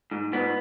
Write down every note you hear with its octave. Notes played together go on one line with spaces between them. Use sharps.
G#2
G#2 B3